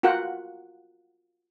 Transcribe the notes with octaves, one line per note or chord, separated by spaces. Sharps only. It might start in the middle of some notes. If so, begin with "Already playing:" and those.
F4 F#4 A#4 F#5 G5